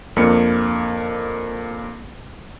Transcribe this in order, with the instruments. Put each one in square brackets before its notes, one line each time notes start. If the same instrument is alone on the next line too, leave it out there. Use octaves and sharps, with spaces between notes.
[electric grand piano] F2 A#3 D4 C#7